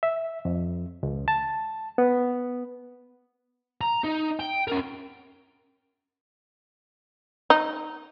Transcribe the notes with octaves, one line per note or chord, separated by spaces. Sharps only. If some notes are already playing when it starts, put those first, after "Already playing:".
E5
F2
C#2
A5
B3
A#5
D#4
G5
C#4 A#4
D#4